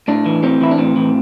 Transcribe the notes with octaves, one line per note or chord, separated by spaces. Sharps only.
A2 D4
E3
A2 C4
E3 E4
D4
A2 C4
E3